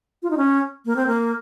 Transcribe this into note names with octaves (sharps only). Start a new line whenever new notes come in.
F4
D#4
C#4
A#3
C4
A#3